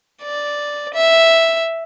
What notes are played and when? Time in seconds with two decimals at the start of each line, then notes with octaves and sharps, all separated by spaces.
0.22 D5
0.94 E5